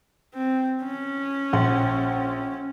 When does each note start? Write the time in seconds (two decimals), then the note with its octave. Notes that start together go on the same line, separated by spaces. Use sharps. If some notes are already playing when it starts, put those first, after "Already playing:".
0.34 C4
0.83 C#4
1.53 A#1 F#5 C6